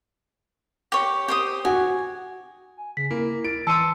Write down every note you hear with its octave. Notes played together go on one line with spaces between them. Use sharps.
G4 C#5
G4 C5 D#6
F#4 G#5
G#5
C#3 B6
A#3 E4
A6 D7
E3 A5 C6 E6 C#7 D#7